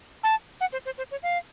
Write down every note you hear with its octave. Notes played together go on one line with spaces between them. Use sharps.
A5
F#5
C5
C5
C5
C#5
F5